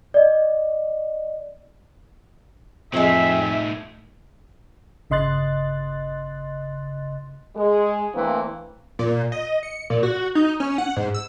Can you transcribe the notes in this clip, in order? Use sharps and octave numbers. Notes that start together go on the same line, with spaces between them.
D5 D#5
F2 A2 G#3 C4 D#4 E5
G1 C#3 D#5 C6 F#6 A6
G#3
D3 E3 A3 A#3 C4
A#2
D#5
C#7
A#2
F#4
D#4
C#4
F#5
G#2
E6